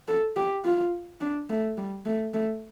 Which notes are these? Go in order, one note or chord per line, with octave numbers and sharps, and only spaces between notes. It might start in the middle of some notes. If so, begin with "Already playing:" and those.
A4
G4
F4
D4
A3
G3
A3
A3